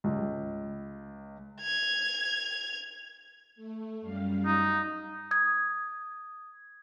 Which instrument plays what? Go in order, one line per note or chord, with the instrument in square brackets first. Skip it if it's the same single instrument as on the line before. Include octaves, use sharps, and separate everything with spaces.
[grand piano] C#2
[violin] G#6 F7
[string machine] A3
F#2 G3 F5
[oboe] D#4
[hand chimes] D#6 G#6